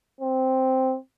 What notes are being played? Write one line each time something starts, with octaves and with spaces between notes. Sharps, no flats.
C4